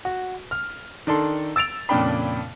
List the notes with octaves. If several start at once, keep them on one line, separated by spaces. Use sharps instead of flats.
F#4
F6
D#3 D4 A4 C6
E6 A6 D7 F7
F2 A#2 C#3 D4 G5 B5